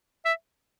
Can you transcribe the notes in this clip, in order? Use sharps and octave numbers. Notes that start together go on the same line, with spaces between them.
E5